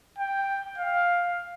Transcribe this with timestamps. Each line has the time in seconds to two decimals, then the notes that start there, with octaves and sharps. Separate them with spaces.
0.18 G5
0.78 F5